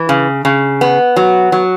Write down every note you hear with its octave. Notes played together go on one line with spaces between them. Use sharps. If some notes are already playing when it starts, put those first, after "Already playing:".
Already playing: E3
C#3
C#3
B3
F#3
F#3